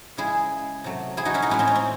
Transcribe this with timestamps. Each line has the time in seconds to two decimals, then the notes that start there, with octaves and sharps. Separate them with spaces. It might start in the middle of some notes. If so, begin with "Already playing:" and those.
0.17 C#3 G#3 E4 G#4
0.84 C3 F#3 A3
1.17 E4 G#4
1.25 D#4 F#4
1.34 C#4 E4
1.42 D#4 F#4
1.50 A2 G#3 C#4 E4
1.59 C4 D#4
1.67 C#4
1.75 C4